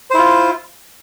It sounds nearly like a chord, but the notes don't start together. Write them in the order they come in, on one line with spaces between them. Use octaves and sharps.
C5 E4 F4